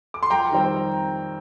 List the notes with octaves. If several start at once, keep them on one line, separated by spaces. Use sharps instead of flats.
D6
C6
F2 G5 A#5
D#3 G3 C4